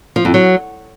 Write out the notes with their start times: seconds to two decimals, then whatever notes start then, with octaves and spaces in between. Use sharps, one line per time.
0.16 F3
0.25 F2
0.34 F#3